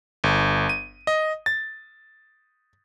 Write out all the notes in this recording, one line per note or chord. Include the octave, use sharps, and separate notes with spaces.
G1
D#7
D#5
A6